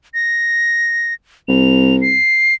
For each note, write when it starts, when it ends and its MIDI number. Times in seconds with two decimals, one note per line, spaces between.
0.14 1.14 94
1.48 2.17 36
1.48 1.96 101
2.02 2.54 96